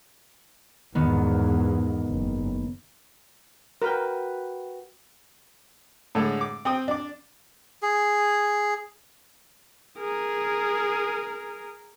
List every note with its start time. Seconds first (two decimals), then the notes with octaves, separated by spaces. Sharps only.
0.95 E2 G#2 D#3 B3
2.08 F#1
3.82 F#4 A#4 B4 G5
6.15 A2 D3 G#3
6.41 D6
6.65 C4 G5 D#6
6.88 D4 D6
7.82 G#4
9.98 G#4 A#4